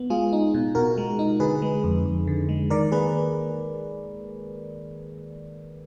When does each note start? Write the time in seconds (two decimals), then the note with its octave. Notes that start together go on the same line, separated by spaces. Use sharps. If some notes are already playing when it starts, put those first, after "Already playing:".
Already playing: B3
0.10 G#3 F4 G#4
0.33 D#4
0.54 B2
0.75 B2 F#4 A#4
0.98 G#3
1.19 D#4
1.40 D3 G#4 B4
1.62 G#3
1.84 F2
2.05 F2
2.27 D3
2.49 G#3
2.70 D#3 A#4 D5
2.92 A#3 G#4 B4